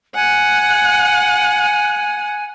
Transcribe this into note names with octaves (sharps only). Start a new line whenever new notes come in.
F#5 G#5